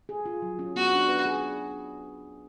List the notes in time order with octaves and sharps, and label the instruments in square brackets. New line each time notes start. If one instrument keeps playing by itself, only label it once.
[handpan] G#4
F4
F#3
C#4
[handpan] B3 [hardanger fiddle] F#4
[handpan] D4
B4
G#4